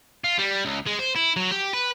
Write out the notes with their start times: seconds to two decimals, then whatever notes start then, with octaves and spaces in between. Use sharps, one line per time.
0.24 F4
0.39 G3
0.65 C#2
0.87 G#3
0.99 C5
1.16 E4
1.36 F#3
1.51 G4
1.74 B4